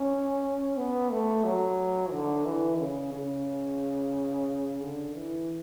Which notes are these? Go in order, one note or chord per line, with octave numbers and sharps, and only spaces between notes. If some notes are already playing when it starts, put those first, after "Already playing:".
Already playing: C#4
B3
A3
F#3
D3
E3
C#3
C#3
D3
E3